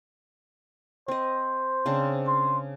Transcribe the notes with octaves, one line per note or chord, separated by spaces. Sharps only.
C4 C5 D#5
C#3 C4 D4
C6